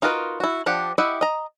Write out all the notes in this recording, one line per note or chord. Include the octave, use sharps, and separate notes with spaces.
D#4 F4 F#4 A#4 B4
E4 F#4
F3 D4 G4 F#5
E4 G4 D#5 E5 F#5
D#5 A#5